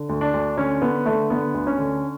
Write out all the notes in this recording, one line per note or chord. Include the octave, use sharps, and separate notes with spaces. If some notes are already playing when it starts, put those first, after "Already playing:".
Already playing: D3
D2
D4
D2
D3 C#4
D3 B3
D3 A3
D3 B3
D2
C#4
D3